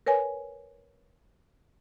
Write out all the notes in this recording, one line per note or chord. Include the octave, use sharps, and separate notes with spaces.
A#4 B4 C#5 G#5